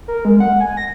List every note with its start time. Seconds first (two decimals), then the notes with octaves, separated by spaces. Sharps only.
0.08 A#4
0.25 G#3
0.40 F#5
0.60 G#5
0.77 A#6